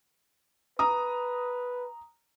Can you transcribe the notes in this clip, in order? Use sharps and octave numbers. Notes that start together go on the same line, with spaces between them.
B4 A#5 D#6